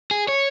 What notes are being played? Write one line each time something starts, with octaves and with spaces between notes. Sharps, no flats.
G#4
C#5